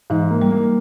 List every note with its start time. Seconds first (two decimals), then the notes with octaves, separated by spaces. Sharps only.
0.10 G#2 E3
0.31 A#3
0.42 G3
0.51 A#3